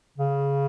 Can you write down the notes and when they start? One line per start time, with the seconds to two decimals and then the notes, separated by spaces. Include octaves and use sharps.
0.18 C#3